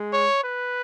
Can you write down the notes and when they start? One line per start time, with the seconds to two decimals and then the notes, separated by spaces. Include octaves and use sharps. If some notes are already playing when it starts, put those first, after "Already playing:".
Already playing: G#3
0.12 C#5
0.44 B4